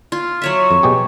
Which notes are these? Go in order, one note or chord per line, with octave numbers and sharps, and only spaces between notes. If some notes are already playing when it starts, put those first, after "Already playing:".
F4
F#3 C#5 E5
F2
B2 G4 G#4